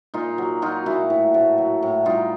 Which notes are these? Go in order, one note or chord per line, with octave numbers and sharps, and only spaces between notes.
A#2 D#4 F4
F#3
F#3 D#4 F4
A#2 E4 F#4
A2
A2
F#3
A2
G3 D#4 F4